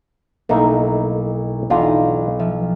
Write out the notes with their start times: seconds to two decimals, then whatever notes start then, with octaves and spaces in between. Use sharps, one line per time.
0.49 B1 A3 A#3 D#4 E4
1.70 B1 E2 D4 F4
2.40 F3 E5